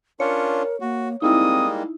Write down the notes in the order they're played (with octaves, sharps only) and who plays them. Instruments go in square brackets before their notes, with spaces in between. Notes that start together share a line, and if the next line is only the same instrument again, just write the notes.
[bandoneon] C#4 D4 F4 [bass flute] A#4 [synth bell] C#5
[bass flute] A#3 [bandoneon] F#4
[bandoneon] G3 G#3 A#3 [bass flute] C4 [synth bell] D#4 E4 [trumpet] D#6